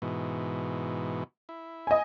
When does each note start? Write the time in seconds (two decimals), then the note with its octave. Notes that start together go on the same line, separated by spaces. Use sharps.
0.02 G#2 B2 E3
1.49 E4
1.87 D#5 G#5